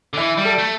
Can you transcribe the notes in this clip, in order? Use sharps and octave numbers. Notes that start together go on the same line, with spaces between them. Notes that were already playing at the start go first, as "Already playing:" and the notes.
D3
E3 E5
G3
A4
A3